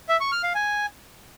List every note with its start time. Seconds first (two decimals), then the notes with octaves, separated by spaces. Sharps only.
0.09 E5
0.20 C#6
0.32 F6
0.43 F5
0.55 G#5